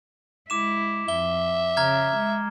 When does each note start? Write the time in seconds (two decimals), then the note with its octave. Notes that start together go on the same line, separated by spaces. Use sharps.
0.50 G#3 E4 D6 E7
1.08 F2 E5 G7
1.77 C#3 A#5 F6 G#6
2.16 G#3